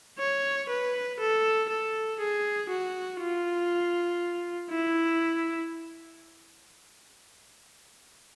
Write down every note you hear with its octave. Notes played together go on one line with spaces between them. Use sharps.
C#5
B4
A4
A4
G#4
F#4
F4
E4